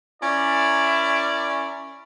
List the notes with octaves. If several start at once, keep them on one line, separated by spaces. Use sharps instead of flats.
C#4 E4 A#4 D5